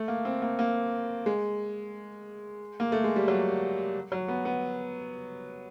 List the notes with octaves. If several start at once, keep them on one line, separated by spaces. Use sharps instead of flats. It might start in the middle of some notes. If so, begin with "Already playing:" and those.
Already playing: A3
A#3
C4
A#3
A#3
G#3
A#3
A3
G#3
G3
F#3
F#3
B3
B3